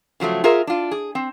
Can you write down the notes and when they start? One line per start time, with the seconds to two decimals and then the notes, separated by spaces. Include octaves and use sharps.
0.20 C#3 F3 F#3 A3
0.44 F4 G#4 A#4 E5
0.67 D4 F4
0.91 G#4
1.15 C4